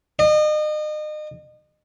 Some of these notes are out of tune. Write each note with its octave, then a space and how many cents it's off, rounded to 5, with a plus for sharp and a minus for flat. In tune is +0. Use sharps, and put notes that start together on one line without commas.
D#5 -35